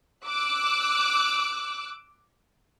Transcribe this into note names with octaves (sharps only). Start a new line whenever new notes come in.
D6 E6 F#6